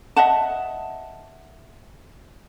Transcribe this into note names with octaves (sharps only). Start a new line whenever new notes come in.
D#5 E5 F#5 A5